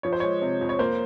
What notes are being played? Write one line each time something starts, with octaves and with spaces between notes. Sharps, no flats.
F3 C#5
C5
G#3 C#5
C3
F2
C#5
A#3 C5